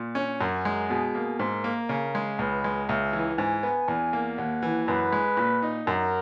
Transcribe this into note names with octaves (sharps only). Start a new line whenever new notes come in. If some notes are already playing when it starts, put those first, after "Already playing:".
Already playing: A#2
C#4
F#2 A#4
G#3
B2 G#4
A#3
G#2 A#4
A#3
C#3
G#3
C#2 B4
G#3
C#2 E5
E3
G#2 G#5
B3
E2
A#3
D#2 F#5
E3
F#2 B4
G#3
A#2
D#4
F#2 A#4